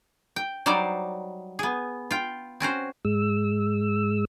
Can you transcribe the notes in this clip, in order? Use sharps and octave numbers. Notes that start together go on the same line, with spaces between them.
G5
F#3 G3 D#4 C5 D5
B3 G#4
F4 G5
C4 C#4 F#4 C5
G#2 G#3 E6